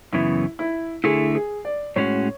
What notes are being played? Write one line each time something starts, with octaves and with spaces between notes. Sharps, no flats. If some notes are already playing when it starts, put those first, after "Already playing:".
F#2 C#3 E3 B3 E4
E4
D3 A3 E4 G#4
G#4
D5
A2 G#3 C#4 F#4 C#5